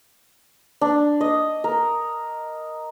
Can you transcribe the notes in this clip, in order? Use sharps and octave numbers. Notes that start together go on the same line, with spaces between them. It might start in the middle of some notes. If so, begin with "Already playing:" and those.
D4
D#5
A#4